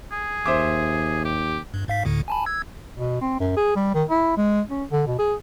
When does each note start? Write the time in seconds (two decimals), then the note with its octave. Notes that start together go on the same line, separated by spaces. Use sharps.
0.12 G#4
0.46 D#2 C5 E5 D6
1.25 G4
1.74 G2
1.88 G#2 F5 B6
2.05 D2 A2 D3
2.28 G#5 A5 B5
2.46 E6 G#6
2.97 B2
3.21 C4
3.40 F#2
3.56 G#4
3.76 G3
3.94 D#3
4.10 E4
4.37 G#3
4.70 C#4
4.91 D3
5.07 B2
5.19 G#4